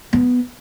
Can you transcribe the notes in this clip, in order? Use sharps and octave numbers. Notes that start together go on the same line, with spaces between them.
B3